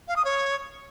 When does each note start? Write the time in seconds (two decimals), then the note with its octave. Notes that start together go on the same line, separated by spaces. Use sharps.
0.08 F5
0.16 D#6
0.25 C#5